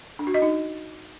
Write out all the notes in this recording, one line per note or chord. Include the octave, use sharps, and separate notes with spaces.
D4
F#4
D#5
D#4